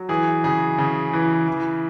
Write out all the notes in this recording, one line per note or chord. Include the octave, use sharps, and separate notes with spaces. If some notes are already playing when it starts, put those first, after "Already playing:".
Already playing: F#3
E3 G#4
C#3 G#4
C#3
E3
E3